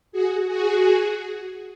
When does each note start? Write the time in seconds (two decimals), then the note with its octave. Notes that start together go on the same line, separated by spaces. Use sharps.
0.12 F#4 G#4
0.49 F#4 G#4